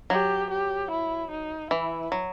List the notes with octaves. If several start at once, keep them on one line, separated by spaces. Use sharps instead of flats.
F#3 G4
G4
E4
D#4
E3 E4
F#3